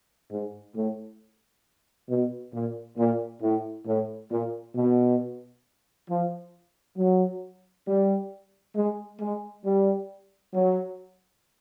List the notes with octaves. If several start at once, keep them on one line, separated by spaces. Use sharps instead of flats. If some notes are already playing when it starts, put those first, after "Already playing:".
G#2
A2
B2
A#2
A#2
A2
A2
A#2
B2
F3
F#3
G3
G#3
G#3
G3
F#3